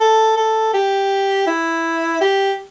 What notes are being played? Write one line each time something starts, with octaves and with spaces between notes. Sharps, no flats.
A4
A4
G4
E4
G4